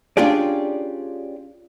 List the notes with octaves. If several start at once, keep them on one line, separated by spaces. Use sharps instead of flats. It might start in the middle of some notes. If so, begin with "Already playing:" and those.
C#4 D4 F4 G4 G#4 D5